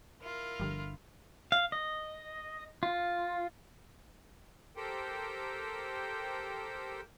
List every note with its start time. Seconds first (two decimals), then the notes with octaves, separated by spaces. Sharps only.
0.22 E4 F4 A#4 F6
0.60 G1 D3 F3 G3
1.52 F5
1.72 D#5
2.83 F4
4.76 G4 A4 A#4 C5 G5